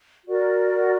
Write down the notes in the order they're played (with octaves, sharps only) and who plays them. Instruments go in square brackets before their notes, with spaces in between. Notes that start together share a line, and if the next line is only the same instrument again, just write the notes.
[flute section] F#4 A#4 D5